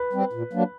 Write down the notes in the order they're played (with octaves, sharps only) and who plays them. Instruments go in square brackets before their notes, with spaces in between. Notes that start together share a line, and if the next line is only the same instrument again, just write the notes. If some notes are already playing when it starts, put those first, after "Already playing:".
Already playing: [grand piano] B4
[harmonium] G3 C4
A#2
F#3 A#3 D4